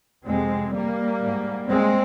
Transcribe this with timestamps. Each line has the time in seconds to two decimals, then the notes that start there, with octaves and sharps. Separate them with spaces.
0.25 F2 C3 G#3 C4
0.73 G3 A#3
1.21 G#2
1.68 G#3 C4